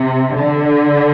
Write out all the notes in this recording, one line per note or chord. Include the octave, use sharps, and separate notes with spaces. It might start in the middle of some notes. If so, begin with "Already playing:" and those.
Already playing: C3
D3